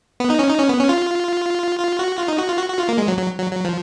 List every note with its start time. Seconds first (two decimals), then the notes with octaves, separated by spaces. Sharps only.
0.20 B3
0.30 D#4
0.39 C#4
0.50 D#4
0.59 C#4
0.69 B3
0.80 C#4
0.89 F4
1.79 F4
1.99 F#4
2.19 F4
2.28 D#4
2.39 F#4
2.48 F4
2.58 F#4
2.69 F#4
2.79 F4
2.89 A#3
2.98 G#3
3.08 F#3
3.18 F#3
3.38 F#3
3.52 F#3
3.64 F3